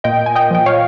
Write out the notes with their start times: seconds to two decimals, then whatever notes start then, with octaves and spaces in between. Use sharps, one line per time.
0.04 A#2 D#5 G5
0.26 G#5
0.35 D#5 G5
0.51 F3 G5
0.66 C#5 F5